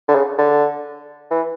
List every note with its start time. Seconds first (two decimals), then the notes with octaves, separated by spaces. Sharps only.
0.08 D3
0.15 C#3
0.38 D3
1.31 E3